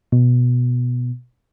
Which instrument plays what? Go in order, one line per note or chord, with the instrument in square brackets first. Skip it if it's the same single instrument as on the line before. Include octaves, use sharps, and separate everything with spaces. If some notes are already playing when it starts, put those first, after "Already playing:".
[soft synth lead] B2